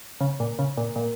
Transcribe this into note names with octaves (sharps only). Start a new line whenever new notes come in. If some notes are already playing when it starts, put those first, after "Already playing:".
C#3
A#2
C#3
A#2
A#2